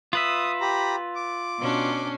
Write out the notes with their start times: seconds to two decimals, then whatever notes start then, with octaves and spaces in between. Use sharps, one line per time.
0.13 F4 B4 E5 D#6
0.61 G4 A#5 B5
1.15 D6
1.60 B2 C#4 D4